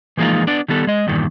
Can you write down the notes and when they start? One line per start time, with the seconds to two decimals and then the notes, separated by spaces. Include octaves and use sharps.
0.17 E3 F3 G#3 A#3 D#4 F4
0.47 B3 D4 D5
0.68 D#3 G3 B3 A4
0.87 G#3 D#5
1.07 E2 G2 A#2 D#3